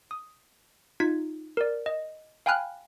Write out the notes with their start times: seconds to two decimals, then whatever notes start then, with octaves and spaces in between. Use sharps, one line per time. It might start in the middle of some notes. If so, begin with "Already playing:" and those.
0.11 D#6
1.00 D#4 F4 G#6 B6
1.57 A#4 D5
1.86 D#5
2.46 F5 G5 G#5 B5 F6 F#6